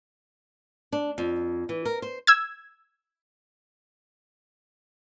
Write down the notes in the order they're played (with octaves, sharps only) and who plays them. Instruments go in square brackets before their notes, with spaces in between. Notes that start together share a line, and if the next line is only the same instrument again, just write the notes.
[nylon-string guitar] D4
F2
E3
A#4
C5
[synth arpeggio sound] E6 G#6